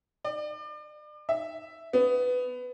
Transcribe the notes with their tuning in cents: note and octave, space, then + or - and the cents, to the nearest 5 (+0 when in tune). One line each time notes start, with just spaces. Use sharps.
D5 +35
E5 +0
B3 +15